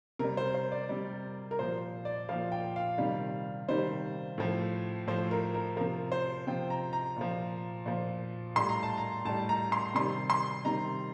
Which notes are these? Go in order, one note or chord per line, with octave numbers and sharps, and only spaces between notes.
C3 G3 A#4
C5
C5
D5
C3 G3
A#4
A#2 F3 C5
D5
A#2 F3 F5
G5
F5
C3 D#3 G3
C3 D#3 G3 C5
A2 F3
A2 F3 C5
A#4
A#4
C3 F3 A#4
C5
C3 F3 G5
A#5
A#5
A#2 F3
A#2 F3
A2 G3 C6
A#5
A5
A#5
A2 G3 A5
A#5
C6
C3 D#3 G3 C6
C6
C3 D#3 G3 A#5